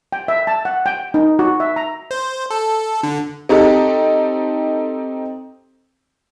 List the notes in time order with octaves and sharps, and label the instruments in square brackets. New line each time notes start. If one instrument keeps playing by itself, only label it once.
[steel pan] G5
E5
A5
F#5
G5
D#4
F#4
E5
A#5
[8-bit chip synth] C5
A4
D3
[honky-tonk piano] C4 D#4 G4 A4